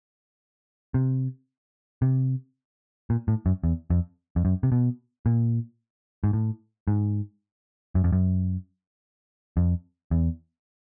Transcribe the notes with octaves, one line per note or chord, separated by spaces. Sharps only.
C3
C3
A#2
A2
F#2
E2
F2
F2
F#2
C3
B2
A#2
G#2
A2
G#2
F#2
F2
F#2
F2
E2